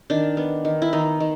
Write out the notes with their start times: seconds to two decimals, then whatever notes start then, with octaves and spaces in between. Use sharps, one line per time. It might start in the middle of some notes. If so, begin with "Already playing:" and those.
0.10 D#3 D4
0.37 B3
0.65 D#3
0.82 E4
0.93 D#3 D#4
1.20 D#3